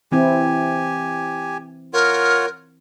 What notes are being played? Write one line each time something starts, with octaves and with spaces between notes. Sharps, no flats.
E3 C4 E4 G4 G#5
F4 A#4 C#5 F#5